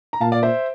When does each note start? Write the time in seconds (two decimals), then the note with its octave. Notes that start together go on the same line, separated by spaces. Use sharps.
0.13 A#5
0.21 A#2 F5 A5
0.32 D5 F5
0.43 C5 E5